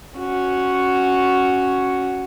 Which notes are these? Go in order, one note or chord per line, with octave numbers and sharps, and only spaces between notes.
C#4 F#4